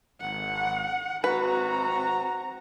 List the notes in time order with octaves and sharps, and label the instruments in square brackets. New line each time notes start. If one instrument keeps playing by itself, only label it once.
[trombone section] G#1 [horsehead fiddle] F#5
[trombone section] G#1 F#4 [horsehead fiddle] C4 A#5 [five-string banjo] B4